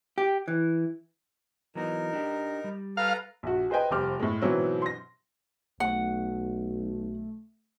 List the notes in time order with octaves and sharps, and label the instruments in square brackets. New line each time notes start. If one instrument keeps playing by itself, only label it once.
[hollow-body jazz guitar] G4
E3
[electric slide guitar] E3 F#3 B3 [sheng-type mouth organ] D#4 A#4
[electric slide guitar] D4 G4
G3
[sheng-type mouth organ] A4 B4 A#5 [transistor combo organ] F5
[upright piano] A#1 F#4
G#4 B4 C5 D#5 G5 G#5
F1 G3 C5 D6 F6
A2 G#3
G#2 B2 E3 F#3 C4
C6 A#6
[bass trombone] B1 [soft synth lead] A3 [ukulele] F#5